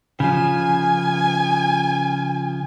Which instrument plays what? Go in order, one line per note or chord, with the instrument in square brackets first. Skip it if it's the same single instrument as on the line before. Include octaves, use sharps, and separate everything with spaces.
[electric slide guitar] C#3 F3 [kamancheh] G#5